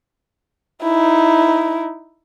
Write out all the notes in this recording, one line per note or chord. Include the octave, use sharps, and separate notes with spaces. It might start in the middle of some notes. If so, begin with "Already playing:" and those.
D#4 E4